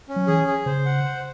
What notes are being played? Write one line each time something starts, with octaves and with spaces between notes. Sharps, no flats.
C#4
F#3
E3 G#4
G#4
C#3 C5
F#5
C5